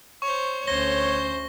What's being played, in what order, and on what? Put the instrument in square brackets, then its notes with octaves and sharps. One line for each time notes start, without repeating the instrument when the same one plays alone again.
[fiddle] C5 C#5 [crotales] C#6
[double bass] D2 C#4 [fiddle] C5 [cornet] C#5 [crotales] A#6 G7